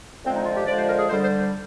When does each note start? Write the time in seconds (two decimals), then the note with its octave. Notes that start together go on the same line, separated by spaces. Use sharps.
0.25 D3 F3 G#3 C4
0.35 D#4
0.46 F4
0.56 G4
0.67 D3 F3 G#3 D5
0.78 C5
0.88 A#4
0.99 G#4
1.09 D3 G3 C5
1.24 C5